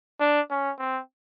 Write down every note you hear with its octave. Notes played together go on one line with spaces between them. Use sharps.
D4
C#4
C4